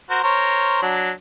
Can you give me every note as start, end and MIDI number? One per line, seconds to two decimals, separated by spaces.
0.10 0.19 66
0.10 0.19 70
0.10 0.19 72
0.23 0.82 70
0.23 0.82 72
0.23 0.82 73
0.82 1.11 54
0.82 1.11 62